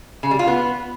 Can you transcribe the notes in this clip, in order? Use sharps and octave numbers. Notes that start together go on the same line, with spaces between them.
C#3
G3
F4
B3